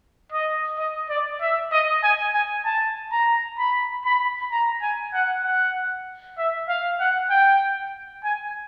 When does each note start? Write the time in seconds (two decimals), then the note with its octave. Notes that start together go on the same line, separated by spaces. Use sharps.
0.32 D#5
0.78 D#5
1.10 D5
1.41 E5
1.72 D#5
2.04 G#5
2.34 G#5
2.65 A5
3.12 A#5
3.58 B5
4.05 B5
4.51 A#5
4.82 G#5
5.13 F#5
5.44 F#5
6.38 E5
6.69 F5
7.00 F#5
7.30 G5
8.24 G#5